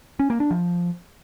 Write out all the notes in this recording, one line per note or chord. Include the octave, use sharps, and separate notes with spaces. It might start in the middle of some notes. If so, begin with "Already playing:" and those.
C#4
A#3
D4
F3